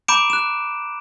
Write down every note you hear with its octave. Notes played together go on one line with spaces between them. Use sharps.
A#5 B5 D6 G6 D7 E7
F#6 E7